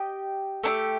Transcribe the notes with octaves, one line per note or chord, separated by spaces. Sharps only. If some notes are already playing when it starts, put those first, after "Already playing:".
Already playing: G4 D#5
A3 D4 G4